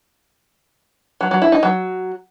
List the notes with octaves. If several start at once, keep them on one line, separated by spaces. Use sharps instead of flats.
F#3
F#3
E4
D#4
F#3